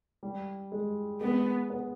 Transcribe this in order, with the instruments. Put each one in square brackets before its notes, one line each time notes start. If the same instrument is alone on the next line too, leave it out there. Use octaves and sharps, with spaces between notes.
[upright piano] G3
G#3
[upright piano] G#3 [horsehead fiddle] B3
[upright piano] B3